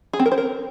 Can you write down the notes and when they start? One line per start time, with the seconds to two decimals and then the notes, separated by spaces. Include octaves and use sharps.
0.13 G#4
0.19 C4
0.26 A#4
0.32 C5
0.38 A#4